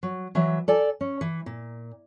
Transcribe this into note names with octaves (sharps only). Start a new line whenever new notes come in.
F#3
E3 F#3 E5
A4 D5 G#5
C#4
E3
A#2